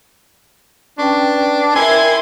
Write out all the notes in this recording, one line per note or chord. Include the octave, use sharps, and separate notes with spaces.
C#4 D4 B4 G5
E4 A#4 G5 G#5 C6 E6 G#6